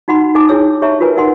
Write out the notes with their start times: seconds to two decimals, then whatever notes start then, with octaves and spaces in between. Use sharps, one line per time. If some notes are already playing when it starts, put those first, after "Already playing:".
0.08 D#4 F#4 F#5 B5 C6
0.35 D#4 A4 G#5 A5 D6
0.49 D4 E4 G#4 C#5 E6
0.82 G4 C#5 E5 A5 A#5
1.00 F4 F#4 A#4 B4 G#5
1.17 D#4 A#4 F#5 G#5 C6